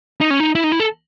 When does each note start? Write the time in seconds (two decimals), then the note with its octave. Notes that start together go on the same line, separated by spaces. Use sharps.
0.21 D#4
0.31 C#4
0.40 D#4
0.55 E4
0.64 D#4
0.72 E4
0.80 A4